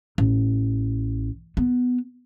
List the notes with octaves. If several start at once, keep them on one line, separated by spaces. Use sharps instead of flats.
A1
B3